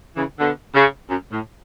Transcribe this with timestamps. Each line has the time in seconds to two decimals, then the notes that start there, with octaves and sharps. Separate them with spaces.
0.16 C#3 E3
0.40 B2 D3
0.74 C#3
1.09 F#2
1.31 A2